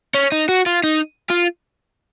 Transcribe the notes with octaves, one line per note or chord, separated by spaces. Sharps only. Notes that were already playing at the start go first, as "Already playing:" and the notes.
C#4
D#4
F#4
F4
D#4
F4